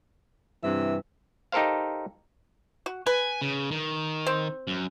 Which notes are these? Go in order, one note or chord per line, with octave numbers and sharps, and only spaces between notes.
G2 C3 E3 E5
D#4 G4 A4 A#4 C5 F5
F#4
B4 G#5
C#3
D#3
C4
F#2